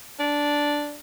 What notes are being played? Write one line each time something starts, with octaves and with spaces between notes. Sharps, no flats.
D4